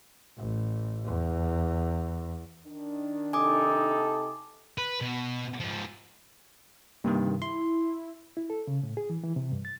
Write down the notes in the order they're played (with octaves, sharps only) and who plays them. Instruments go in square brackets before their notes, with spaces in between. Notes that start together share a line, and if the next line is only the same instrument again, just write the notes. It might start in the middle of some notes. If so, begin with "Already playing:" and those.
[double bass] A1
E2
[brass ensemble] D#3 D4
[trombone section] C3 D#4 A4 [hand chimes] G#5 D6 D#6
[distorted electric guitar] B4
B2
G#2 F3
[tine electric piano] G2 C3 D#3 [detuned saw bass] A#3
[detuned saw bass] E4 [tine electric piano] C6
[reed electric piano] E4
A4
C#3
A2
G#4
E3
E3
C3
G2
A6